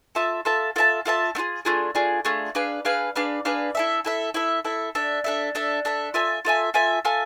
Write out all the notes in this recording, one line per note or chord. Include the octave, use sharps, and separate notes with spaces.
F4 A4 E5 A5
F4 A4 E5 A5
F4 A4 E5 A5
F4 A4 E5 A5
A3 D4 F4 G#4
A3 D4 F4 G#4
A3 D4 F4 G#4
A3 D4 F4 G#4
D4 G#4 B4 F5
D4 G#4 B4 F5
D4 G#4 B4 F5
D4 G#4 B4 F5
E4 A4 E5
E4 A4 E5
E4 A4 E5
E4 A4 E5
D4 A4 E5
D4 A4 E5
D4 A4 E5
D4 A4 E5
F4 A4 E5 G#5
F4 A4 E5 G#5
F4 A4 E5 G#5
F4 A4 E5 G#5